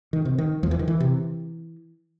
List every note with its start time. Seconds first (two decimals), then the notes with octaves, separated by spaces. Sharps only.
0.13 D#3
0.25 C3
0.38 D#3
0.63 E2 F3
0.71 E3
0.79 D#3
0.88 E3
1.00 C3